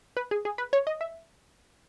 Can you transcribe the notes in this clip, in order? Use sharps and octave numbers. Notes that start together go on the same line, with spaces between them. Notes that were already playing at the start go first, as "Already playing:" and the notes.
B4
G#4
G#4
B4
C#5
D#5
E5